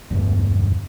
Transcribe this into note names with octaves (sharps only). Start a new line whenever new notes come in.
E1 D2 G2 B3